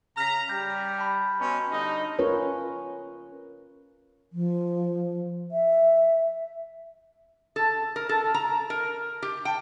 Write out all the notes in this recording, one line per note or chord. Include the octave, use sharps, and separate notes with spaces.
C#3 A#5 F6 B6
G3 G6
A5 B5
B2 C#4 A#5 C6
D3 G3 D#4
C#4 F4 A#4 B4 C#5
F3
E5
A4
A#4
A4
A#5
A#4
G4
G5